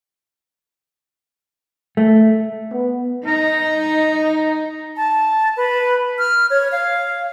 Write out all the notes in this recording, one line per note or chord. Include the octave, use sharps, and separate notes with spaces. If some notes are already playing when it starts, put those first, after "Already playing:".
A3
B3
D#4 A#5
A5
B4
F6
C#5
F5